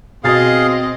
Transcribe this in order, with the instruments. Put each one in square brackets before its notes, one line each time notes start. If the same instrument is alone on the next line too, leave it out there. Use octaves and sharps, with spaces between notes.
[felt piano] B2 A6 [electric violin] C4 D#5 [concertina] G#4 F5